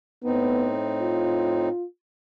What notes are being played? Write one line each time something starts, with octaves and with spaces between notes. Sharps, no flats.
A2 B3 C4 D#4
F4